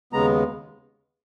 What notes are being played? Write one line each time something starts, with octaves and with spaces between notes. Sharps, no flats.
D#2 C#3 G#3 B3 A#5